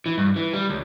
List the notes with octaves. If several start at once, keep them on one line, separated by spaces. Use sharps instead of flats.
E3
G2
E3
G3
C#2